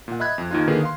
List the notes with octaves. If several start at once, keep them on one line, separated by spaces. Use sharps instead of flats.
A#2 F#5
D#5 E5 B5 F#6 G#6
F2
D#2 D#4 F4
D3 D#3 A#3 G#4 B4
F5 C6